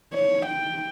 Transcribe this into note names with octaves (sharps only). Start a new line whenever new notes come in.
C#5
G5